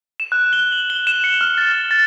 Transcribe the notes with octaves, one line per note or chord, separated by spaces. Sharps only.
E7
F#6
G7
F#7
G7
E7
C#7
F6
A6
F6
A6